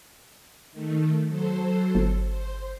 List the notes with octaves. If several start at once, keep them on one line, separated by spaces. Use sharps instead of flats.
D#3 A3
F#3 A4 C5
G1
C5